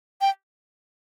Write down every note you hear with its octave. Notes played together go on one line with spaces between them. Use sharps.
G5